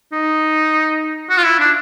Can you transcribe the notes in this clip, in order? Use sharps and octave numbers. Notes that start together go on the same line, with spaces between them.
D#4
F#4
F4
E4
D4